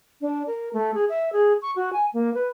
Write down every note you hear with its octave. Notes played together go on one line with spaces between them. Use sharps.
D4
A#4
A3
G#4
E5
G#4
C#6
F#4
G#5
A#3
B4